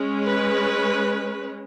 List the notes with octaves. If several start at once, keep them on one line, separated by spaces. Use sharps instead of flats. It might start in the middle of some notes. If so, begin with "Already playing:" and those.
Already playing: G#3 C#4
B4